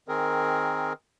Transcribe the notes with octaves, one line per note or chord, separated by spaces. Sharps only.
D#3 C4 G#4 A#4